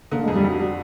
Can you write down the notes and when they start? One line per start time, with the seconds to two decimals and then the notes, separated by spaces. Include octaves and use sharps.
0.12 D3 A#3
0.19 A3
0.23 G#3
0.28 F2
0.36 G3
0.44 F2 F#3
0.59 F#3 G3